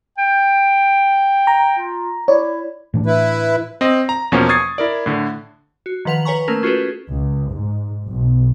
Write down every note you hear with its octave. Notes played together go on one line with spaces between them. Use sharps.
G5
A#5
F4
E4 C#5 D5
A2 E3 D4
E4 B4
C4 D#5
A#5
E2 B2 F3 A#3 C#4
C#6 D#6 G#6 A6 C7
E4 A#4 D5
A2 D3
F#4
D#3 F3 B4 F#5 F7
B4 C#5 G#5 A#5 C#6
A3 A#3 C#4 A#4
C#4 F4 F#4 G#4 A4 B4
C#2
G#2
B1